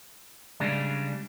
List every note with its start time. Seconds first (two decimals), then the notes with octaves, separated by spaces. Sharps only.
0.60 C#3 G3 G#3 D4